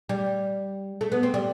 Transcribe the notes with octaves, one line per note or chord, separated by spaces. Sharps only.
G3
A3
B3
C4
G3